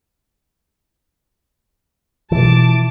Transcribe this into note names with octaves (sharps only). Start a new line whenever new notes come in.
B2 E3 F4 A5 D6